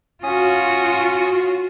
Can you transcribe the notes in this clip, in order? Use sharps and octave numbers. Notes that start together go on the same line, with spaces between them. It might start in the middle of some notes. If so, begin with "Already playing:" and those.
C#4 F4 F#4 D#6